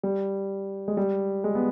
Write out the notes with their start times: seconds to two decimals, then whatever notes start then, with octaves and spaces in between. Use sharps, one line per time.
0.03 G3
0.88 G#3
0.97 G3
1.44 G#3
1.55 B3